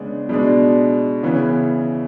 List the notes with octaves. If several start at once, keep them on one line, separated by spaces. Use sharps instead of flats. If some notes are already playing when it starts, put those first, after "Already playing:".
Already playing: C#3 G#3 B3 D4
B2 G#3 D4
C#3 E3 B3